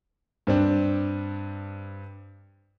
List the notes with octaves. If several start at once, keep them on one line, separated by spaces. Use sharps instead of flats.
G2 C4 D4